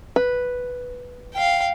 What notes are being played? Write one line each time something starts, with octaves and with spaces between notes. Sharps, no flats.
B4
F5 G5